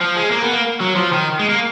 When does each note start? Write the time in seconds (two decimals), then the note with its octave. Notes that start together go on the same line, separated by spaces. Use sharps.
0.01 F3
0.17 G#3
0.32 A#3
0.44 B3
0.53 A#3
0.81 F#3
0.96 F3
1.13 D#3
1.39 G#3
1.49 A#3